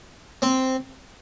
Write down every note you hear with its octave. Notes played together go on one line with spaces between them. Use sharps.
C4